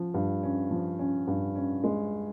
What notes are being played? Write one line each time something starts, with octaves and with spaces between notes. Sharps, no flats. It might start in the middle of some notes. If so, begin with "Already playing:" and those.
Already playing: F3 C#4
G2
C#4
F3
C#4
G2
C#4
G#3